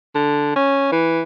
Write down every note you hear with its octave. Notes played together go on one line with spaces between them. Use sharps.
D3
C#4
E3